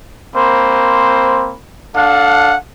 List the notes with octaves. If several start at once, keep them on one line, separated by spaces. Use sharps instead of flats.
A#3 C4 C5 B5
D4 A4 F5 F#5